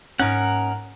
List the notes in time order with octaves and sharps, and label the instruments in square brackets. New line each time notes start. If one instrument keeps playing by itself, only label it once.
[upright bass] G#2 A#3 [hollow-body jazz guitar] C#4 D#4 [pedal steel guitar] A#4 F#5